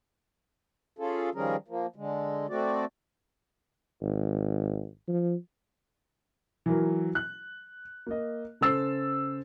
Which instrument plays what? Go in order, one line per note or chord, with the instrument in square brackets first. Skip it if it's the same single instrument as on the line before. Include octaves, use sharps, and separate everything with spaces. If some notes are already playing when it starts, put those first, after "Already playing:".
[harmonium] C#4 F4 G#4 A4
D#3 F3 G3 C#4 G#4 A#4
F3 A#3
D3 G#3
A3 C4 F#4 D5
[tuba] G#1
F3
[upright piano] E3 F#3 A#4
F#6
A#3 D#5
C#3 A4 C5 E6 A6 C7